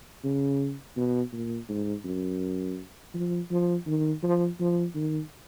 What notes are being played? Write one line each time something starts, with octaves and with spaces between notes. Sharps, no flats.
C#3
B2
A#2
G#2
F#2
F3
F3
D#3
F3
F3
D#3